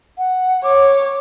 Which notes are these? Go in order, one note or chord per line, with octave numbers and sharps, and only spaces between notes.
F#5
C#5 D6